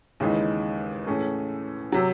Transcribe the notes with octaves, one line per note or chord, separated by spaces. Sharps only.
D#2 C#3 E3 G#3 D#4
A2 E3 A3 C#4 G#4
C3 F#3